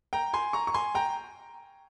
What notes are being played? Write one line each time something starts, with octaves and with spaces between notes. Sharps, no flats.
G5 A#5
G#5 C6
A#5 C#6
C#6
G#5 C6
G5 A#5